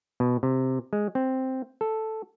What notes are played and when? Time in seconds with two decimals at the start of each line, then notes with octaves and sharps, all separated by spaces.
0.20 B2
0.43 C3
0.93 G#3
1.15 C4
1.81 A4